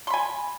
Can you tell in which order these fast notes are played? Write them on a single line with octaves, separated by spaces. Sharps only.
C6 B5 G#5